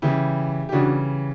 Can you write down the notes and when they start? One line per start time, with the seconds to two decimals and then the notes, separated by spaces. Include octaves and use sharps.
0.02 C#3 E3 G3 E4 G4
0.69 G4
0.72 C#3 E3 G3 D4 F#4